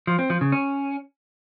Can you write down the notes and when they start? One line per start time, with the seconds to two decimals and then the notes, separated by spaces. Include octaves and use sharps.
0.07 F3
0.19 C4
0.30 F3
0.41 C#3
0.52 C#4